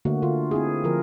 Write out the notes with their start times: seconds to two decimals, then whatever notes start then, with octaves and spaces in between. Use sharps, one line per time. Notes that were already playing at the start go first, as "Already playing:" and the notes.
0.05 D3 A3 A#3 F#4
0.22 D3 F4
0.51 C4 E4 G#4
0.84 D3 F3 F4 A#4